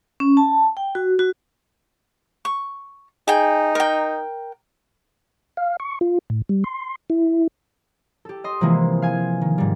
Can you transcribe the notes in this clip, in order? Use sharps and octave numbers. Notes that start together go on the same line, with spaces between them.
C#4
A5
G5
F#4
F#4
C#6
D#4 G#4 G5
A#4 G5
F5
C#6
F4
A2
G3
C6
E4
G4 A4
D#5 C6
C3 E3 F3 G#3 A#3
F5 G#5
D#3
G#2 G3